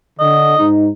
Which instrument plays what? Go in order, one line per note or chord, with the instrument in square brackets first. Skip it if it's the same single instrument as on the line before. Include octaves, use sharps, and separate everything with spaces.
[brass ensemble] D3 [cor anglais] D#5
[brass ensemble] G#2 D#4